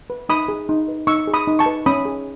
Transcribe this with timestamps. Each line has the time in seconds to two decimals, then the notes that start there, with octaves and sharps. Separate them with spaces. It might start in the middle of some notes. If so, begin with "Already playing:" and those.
0.10 B4
0.29 D#4 B5 D#6
0.48 G#4
0.69 D#4
0.88 B4
1.07 D#4 C#6 E6
1.27 G#4
1.34 B5 D#6
1.47 D#4
1.59 A5 C#6
1.66 B4
1.86 C#4 B5 D#6
2.05 G#4